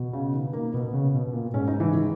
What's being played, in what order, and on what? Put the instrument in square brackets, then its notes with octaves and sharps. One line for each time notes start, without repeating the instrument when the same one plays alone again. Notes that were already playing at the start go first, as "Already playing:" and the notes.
Already playing: [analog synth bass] B2
[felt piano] C#3
D#3
A#3
[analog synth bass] B2 [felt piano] B3
[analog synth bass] C#3
B2
B2
A#2
[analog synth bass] G#2 [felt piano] C#4
[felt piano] D#4
E3
D#3